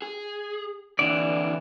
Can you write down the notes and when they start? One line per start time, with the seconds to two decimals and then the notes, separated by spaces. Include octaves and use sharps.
0.02 G#4
0.99 A#2 D3 E3 D5